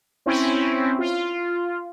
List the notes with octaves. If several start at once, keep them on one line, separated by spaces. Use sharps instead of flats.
C4 C#4 E4
F4